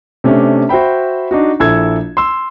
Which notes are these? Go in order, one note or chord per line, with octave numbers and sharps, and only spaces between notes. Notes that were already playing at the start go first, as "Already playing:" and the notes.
C3 A3 C#4 D4
F#4 C5 E5 G5 B5
D4 D#4 F#4
A#1 E4 A4 E6 G#6
C6 E6